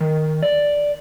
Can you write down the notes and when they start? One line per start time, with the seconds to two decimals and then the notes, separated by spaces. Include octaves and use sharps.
0.01 D#3
0.42 D5